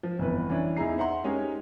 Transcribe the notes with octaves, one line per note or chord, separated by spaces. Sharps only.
F3
G1 F2 E3 B3 B4
E3 C#4 D4
E2 D#4 E4 G#4 A#5 C7
C5 E5 F#5 A#5 C6
G#3 C#4 D#4 G4 G#4 A#4